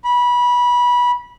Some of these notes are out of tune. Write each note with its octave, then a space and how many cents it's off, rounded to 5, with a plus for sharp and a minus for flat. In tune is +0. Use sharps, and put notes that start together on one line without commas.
B5 -20